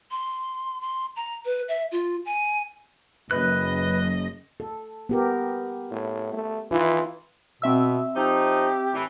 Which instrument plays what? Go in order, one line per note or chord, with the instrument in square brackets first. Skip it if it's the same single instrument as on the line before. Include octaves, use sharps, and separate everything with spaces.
[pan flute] C6
C6
A#5
B4
E5
F4
G#5
[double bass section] F#1 F#2 [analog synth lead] B4 [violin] D#5 [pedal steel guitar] F#6
[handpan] A4
B3 G4 A#4
[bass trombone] A2
A3
[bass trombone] E3 [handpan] D#4 F4
[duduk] B2 [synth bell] C4 E5 E6
[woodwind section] F3 D#4 [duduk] G4
[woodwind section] A2 E3